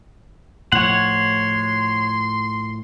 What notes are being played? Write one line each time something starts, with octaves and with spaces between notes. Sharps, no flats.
A2 F3 C#5 F#5 C6